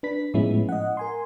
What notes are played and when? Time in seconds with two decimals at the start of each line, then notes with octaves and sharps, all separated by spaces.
0.03 D4 B4 B6
0.34 A2 F3 G#3 B3 C#4 E4
0.69 D#5 F#5
0.97 A#4 G#5 C6